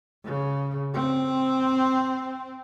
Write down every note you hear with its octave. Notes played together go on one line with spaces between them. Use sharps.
C#3
C4